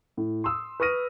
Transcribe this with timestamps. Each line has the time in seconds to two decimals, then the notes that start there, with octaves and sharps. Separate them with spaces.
0.17 A2
0.44 C6 D#6 E6
0.80 B4 C#6 D#6 F6 A#6 D#7